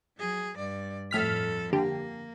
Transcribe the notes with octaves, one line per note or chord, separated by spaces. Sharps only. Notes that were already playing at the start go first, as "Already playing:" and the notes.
F#3 G#4
G2 D5
F2 A2 A4 F6 B6
D3 A#3 G4